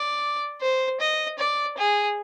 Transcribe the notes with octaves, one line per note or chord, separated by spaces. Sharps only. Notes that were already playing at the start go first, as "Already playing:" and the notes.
Already playing: D5
C5
D#5
D5
G#4